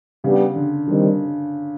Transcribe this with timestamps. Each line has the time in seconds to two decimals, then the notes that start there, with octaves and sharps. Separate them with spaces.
0.24 C#3 G3 B3 D4 G4
0.56 D3
0.87 D3 D#3 G3 C4